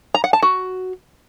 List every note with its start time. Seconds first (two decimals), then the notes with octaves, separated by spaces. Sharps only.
0.14 A#5
0.24 F#5
0.33 A5
0.42 F#4